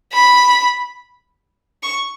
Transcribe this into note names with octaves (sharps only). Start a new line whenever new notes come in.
B5
C#6